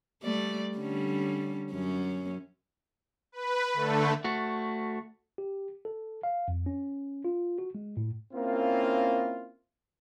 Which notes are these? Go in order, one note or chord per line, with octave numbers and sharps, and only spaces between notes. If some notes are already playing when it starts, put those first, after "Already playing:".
G3 A3 D5
D3 G3 C#4
F#2 C#4
B4
D3 A3 A4
A3 F#4
G4
A4
F5
F2
C#4
F4
F#4
G#3
A2
A#3 C4 C#4 E4 F4